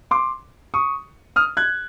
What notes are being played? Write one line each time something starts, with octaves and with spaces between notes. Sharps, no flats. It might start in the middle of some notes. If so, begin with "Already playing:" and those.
C6 D6
C#6 D#6
D#6 F6
F#6 G#6